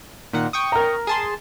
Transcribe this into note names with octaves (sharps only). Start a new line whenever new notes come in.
A#2 D#3 F#5
G5 C#6 D#6
A#4 A#5
G#4 A5 C6